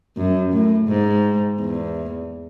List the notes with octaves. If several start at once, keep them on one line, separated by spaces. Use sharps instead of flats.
F#2
A2
G#2
E2